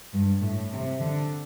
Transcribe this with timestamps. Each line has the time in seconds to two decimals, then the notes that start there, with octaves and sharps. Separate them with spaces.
0.13 G2
0.42 A2
0.72 C3
1.00 D3